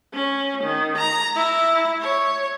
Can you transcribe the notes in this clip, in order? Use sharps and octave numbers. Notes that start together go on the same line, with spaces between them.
C#4
D#3
A#5
E4
C#5